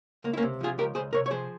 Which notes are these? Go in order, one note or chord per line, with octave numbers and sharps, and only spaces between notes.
C#2 A#3
E4
A#3 C#4
C3
F3 F4 G#4
C#2 G4 A#4
C#2 G#4 C5
C3 A#4 C#5
C#5
F3 G#4 C5